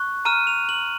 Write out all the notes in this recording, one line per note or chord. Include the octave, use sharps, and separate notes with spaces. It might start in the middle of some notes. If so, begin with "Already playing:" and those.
Already playing: C#6 F#6
A#5 F6 D#7
F7
F#7